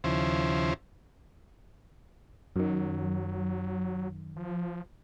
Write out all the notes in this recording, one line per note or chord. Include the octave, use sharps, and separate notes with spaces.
D#2 C#3 F3 E4 C5
F#2 D#3 F#3
F3